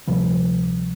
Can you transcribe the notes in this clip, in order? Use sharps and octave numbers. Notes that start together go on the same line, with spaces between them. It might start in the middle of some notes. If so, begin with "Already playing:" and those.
D2 C3 F3 G3